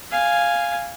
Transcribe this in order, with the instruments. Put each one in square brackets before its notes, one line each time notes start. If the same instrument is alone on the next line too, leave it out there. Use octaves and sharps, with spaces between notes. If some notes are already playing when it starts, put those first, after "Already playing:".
[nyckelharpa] F5 G#5